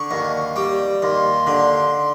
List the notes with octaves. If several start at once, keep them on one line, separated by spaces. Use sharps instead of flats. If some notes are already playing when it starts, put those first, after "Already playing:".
Already playing: D3 C#6
D#2
G3
D#2 C6
D3